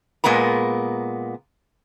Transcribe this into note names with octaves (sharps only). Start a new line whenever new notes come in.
A#2 G#3 B3 A#4 A#5